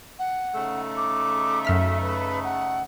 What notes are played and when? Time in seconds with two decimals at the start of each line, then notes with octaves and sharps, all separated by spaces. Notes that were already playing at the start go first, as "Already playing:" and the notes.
0.18 F#5
0.54 C#3 A3 D#4
0.96 D6
1.65 F#2 E5 F6 B6
2.01 B4
2.43 F#5